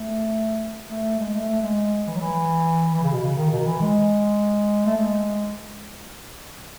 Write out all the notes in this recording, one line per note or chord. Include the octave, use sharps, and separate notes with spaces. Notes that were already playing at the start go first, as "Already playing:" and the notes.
Already playing: A3
A3
G#3
A3
A3
G#3
E3
F#3
E3
E3
C#3
B2
C#3
D#3
B2
D#3
E3
G#3
A3
G#3